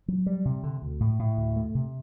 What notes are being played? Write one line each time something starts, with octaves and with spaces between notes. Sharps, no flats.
F#3
G3
C3
D3
D2
A2
A2
D2
A3
C3